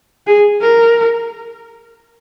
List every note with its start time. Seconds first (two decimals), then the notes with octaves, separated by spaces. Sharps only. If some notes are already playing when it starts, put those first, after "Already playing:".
0.27 G#4
0.62 A#4